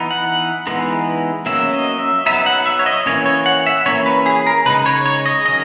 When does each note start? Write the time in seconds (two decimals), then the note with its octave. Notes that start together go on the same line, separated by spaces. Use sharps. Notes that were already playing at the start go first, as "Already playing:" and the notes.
Already playing: E3 B3 D#4
0.11 F#5
0.67 E3 G#3 B3 D#4
1.46 F#3 A#3 C#4 E5
1.73 D#5
1.99 E5
2.26 F#3 B3 D#4 E5
2.46 F#5
2.66 E5
2.79 C#5
2.86 D#5
3.06 E3 A#3 C#4 C#5
3.26 C#5
3.46 F#5
3.67 E5
3.86 E3 A#3 C#4 C#5
4.06 B4
4.26 G#4
4.47 A#4
4.65 C#3 G#3 D#4 B4
4.86 C#5
5.06 C#5
5.26 D#5
5.45 D#3 F#3 C#4 D#5